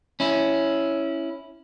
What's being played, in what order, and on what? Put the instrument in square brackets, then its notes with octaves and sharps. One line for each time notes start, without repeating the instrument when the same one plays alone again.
[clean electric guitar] C#4 E4